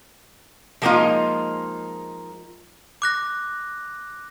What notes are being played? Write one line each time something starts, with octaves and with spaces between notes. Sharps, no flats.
F3 G#3 A#3 D4 D#4 F4
D6 F#6 A#6